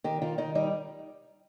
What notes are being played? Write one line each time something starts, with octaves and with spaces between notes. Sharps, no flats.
D#3 G4
D#3 F4
D#3 D#4
G3 D#4